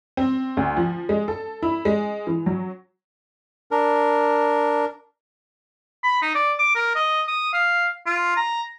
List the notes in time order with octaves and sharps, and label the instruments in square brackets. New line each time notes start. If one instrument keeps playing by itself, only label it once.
[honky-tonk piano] C4
D2
F3
G#3
A4
E4
G#3
E3
F#3
[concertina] D4 A#4
[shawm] B5
D#4
D5
D6
A#4
D#5
D#6
F5
F4
A#5